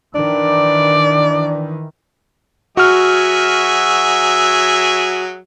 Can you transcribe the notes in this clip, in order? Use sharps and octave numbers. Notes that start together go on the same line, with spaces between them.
D#3 E3 D4 D5
F#3 F#4 G#4 E5 F6